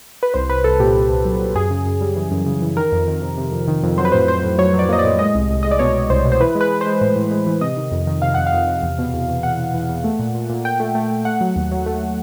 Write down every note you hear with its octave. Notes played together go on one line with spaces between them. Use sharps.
B4
C2 C5
C2 B4
C2 A4
A#2 G4
C2
C2
F#3
F#3
F#2 G#4
C#3
F#2
G3
E3
F#2
C#3
E3
D#3 A#4
F2
D#3
C3
C3
F2
D#3
F2
F#3 C5
B4
A2 C5
A2 C5
A2
F#3 C#5
F#3
D5
A#3 D#5
D5
A2
G#3 D#5
C2
C2
G#3 D#5
D5
B2 C#5
B2
C2 C5
B2
C5
E3 B4
G#3
B4
G#3
C5
G#3
A2 C5
A2
G#3
E3
C3 D#5
D#3
F2
D#3
C3 F5
F2 F#5
F5
F2
C3
E2
B2
E2
E2
E2 F#5
E2
E2
E2
A3
A#2
A#2
A#2
A#2 G5
A3
A3
A3
A3 F#5
F#3
D#2
F#3
A3